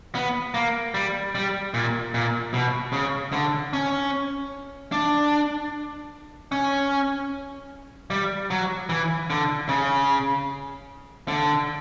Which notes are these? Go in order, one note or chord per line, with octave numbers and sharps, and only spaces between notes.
B3
A#3
G3
G3
A#2
A#2
B2
C#3
D3
C#4
D4
C#4
G3
F#3
E3
D3
C#3
D3